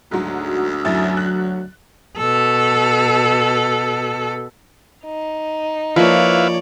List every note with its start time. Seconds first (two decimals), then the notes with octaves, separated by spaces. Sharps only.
0.11 D2 G#2 F#3
0.85 F#2 F#3 E4 A6
1.17 F#6
2.17 B2 A4
5.04 D#4
5.96 F3 A#3 E4 B4 C#5 D5 F5